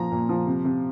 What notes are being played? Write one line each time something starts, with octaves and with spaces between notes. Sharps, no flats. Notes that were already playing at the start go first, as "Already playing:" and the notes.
Already playing: A#2 F3 A#5
A#2
F3
C3
C3